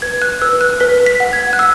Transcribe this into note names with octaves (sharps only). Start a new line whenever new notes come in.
B4 G#6
F#6
B4 E6
F#6
B4 B6
B6
F#5
G#6
F#6
F#5 E6